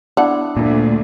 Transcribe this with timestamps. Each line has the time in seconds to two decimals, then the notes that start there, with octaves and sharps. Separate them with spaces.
0.17 B3 D4 E4 F#5
0.57 D2 A#2